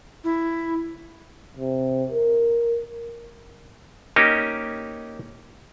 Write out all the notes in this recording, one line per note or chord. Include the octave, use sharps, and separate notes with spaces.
E4
C3
A#4
A#3 C#4 D#4 G4